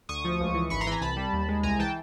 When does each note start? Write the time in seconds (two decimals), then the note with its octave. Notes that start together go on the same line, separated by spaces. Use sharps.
0.09 D2 C#6 D#6
0.25 F3
0.40 C#2
0.55 E3
0.70 G#1 B5 C#6
0.81 A#5 C6
0.87 E3 B5
0.92 G#5 A#5
1.02 C2 A5 B5
1.17 G3
1.33 D#2
1.49 G#3
1.63 C2 G#5 A#5
1.79 E3 G5 A5